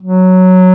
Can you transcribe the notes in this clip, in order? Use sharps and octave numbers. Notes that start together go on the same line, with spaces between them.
F#3